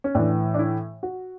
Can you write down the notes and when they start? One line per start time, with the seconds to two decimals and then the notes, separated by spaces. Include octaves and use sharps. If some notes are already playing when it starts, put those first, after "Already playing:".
0.04 C#4
0.15 A2 E3 D4
0.54 D4
0.59 E4
1.03 F#4